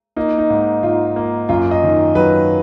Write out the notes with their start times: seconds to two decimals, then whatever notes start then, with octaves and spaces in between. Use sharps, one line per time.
0.16 A#3 D#4
0.38 D#4
0.50 G#2
0.83 G#2 F4
1.16 A#3
1.49 F#2 F4
1.71 D#5
1.83 D#3
2.15 F#3 B4